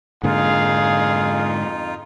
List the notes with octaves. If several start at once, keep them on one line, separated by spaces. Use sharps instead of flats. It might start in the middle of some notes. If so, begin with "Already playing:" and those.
F2 G#2 D3 A#3 D#4 F4 G#4 F5